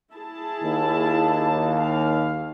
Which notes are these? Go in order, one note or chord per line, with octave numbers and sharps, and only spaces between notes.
E4 G#4 A5
D#2
F5